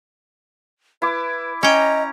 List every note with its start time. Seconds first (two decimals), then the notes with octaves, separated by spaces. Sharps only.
1.02 E4 B4 D6
1.63 C#4 D#5 G5 A#5